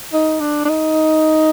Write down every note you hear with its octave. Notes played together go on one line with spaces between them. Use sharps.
D#4
D4
D4
D#4